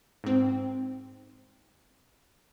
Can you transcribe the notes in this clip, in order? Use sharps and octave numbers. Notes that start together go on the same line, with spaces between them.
G#2 C4